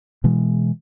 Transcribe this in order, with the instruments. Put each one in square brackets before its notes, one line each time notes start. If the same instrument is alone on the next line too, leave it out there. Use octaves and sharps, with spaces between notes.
[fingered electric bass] B2 E3 G#3